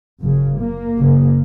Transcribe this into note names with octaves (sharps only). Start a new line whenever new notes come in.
F#1 F#2 C#3
A#3
F#1 F#2 C#3